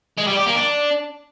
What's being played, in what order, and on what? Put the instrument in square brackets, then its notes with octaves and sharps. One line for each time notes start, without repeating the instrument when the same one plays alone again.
[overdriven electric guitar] G#3
G3
G4
A#3
D4